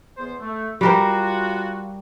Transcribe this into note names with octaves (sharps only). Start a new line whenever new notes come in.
E2 B3 C5
A3
G3 F4 F#4 A#4 C5